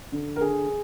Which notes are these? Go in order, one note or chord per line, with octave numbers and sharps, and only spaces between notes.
D3
A#4
D3 G#4